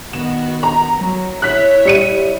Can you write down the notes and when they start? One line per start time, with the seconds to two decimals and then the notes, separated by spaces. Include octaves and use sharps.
0.13 D#3 B3 F#4 E7
0.63 A#5
0.98 F#3
1.42 E4 C#5 E5 F#6 B6
1.85 G3 C#7 D#7